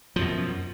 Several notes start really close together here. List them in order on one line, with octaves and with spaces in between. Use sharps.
F3 F#2 B2